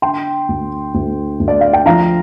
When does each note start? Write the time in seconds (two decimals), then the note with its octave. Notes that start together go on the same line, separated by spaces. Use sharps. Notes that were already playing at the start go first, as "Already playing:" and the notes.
0.02 D3 G5 C6
0.48 D2
0.94 D2
1.40 D2
1.48 D5
1.61 F5
1.73 G5
1.86 F3 F5 A#5